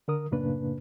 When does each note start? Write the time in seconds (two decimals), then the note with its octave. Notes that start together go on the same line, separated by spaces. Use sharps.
0.08 D3 A#4 D#6
0.31 F#2 A2 C#3 A#3 D4 B4